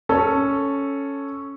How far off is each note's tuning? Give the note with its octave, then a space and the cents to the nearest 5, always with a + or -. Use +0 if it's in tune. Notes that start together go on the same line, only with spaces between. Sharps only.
C#4 +0 A4 +0